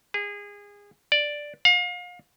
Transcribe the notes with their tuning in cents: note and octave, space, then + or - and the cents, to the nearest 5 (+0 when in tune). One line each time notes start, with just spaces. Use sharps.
G#4 -25
D5 +0
F5 +35